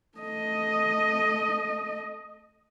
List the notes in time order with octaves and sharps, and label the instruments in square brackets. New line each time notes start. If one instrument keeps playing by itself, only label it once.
[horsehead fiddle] A3 D#5